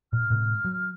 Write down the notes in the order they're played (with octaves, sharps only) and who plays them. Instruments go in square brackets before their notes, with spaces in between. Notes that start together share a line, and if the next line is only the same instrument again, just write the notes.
[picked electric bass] A#2 [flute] F6
[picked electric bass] A2 C3 G#3
F#3